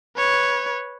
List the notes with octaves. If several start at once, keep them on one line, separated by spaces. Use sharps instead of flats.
B4 C#5